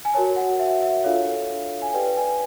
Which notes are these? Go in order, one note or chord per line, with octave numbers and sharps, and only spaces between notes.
G#5
F#4 A#4 C#5 A5
F#5
E5
E5
D4 F4 A4 C#5 F5
G#5
G4 B4 D5 G5
G#5